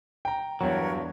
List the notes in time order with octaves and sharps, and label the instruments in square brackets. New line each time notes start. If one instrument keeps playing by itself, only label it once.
[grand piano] G5 A#5
[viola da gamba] E2 [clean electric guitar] G2 F#3 [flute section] A#4 B4 C#5